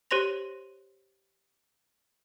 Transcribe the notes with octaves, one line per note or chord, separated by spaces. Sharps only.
G4 C5 C#5 C6 A#6 F7